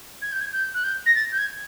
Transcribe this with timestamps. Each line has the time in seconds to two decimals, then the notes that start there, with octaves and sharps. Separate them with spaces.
0.22 G#6
0.32 G6
0.40 G#6
0.53 G6
0.74 F#6
0.84 G6
1.06 A#6
1.15 A6
1.32 G6
1.38 G#6